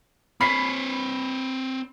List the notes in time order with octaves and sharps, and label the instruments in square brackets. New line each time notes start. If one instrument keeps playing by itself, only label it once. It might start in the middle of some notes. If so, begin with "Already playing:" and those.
[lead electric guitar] C4 C#5 [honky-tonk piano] B5 B6 C7